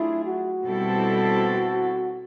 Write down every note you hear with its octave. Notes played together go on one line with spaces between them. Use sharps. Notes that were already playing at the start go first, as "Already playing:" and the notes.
Already playing: F#3 A3 D4 E4 F4 G#4
F#4
B2 G3 C4 E4 A4